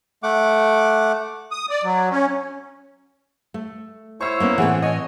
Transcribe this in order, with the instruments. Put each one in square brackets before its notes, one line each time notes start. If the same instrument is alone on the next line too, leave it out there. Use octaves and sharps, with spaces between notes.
[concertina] A3 F#5 D6
[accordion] D#6
D5
F#3
C#4
[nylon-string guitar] A3
[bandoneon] E4 C5 C#5 [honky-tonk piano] C#6 E6
[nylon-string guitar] A#3 B3 C#4
[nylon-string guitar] A2 E3 [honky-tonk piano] C4 G#4 F#5
[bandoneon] C#5 G#5 [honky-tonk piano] D#5